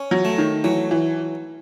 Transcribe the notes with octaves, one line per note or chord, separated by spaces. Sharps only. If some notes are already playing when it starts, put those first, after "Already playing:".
Already playing: C#4
F#3
A3
D#3
E3 F#3
E3